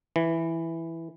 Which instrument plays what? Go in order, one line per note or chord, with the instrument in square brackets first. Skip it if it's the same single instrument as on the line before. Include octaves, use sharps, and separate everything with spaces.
[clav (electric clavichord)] E3